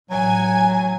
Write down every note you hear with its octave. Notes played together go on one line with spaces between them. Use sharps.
A1 F#3 G#5